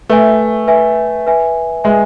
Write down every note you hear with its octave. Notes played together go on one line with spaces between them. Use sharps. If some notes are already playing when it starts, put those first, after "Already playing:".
A3 B4 E5 G#5
B4 E5 G#5
B4 E5 G#5
G#3 B4 E5 G#5